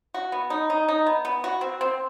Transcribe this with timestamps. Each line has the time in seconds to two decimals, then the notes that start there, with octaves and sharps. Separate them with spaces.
0.14 F#4
0.32 B3
0.50 D#4
0.70 D#4
0.88 D#4
1.06 B3
1.25 B3
1.44 F#4
1.61 C4
1.81 C4